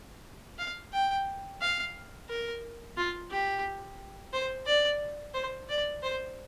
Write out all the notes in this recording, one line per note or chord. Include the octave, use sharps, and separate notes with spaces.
F5
G5
F5
A#4
F4
G4
C5
D5
C5
D5
C5